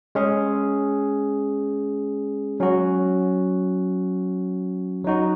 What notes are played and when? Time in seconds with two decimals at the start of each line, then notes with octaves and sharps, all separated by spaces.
0.15 G#3 C#4 G#4
2.60 F#3 C#4 F#4
5.04 F#3 D#4 F#4